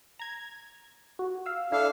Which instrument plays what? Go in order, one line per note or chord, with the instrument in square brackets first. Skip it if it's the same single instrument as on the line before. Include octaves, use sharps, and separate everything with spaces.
[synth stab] A#5 G#6
F#4
F5 E6
[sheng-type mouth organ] D4 A4 F5 [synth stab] E4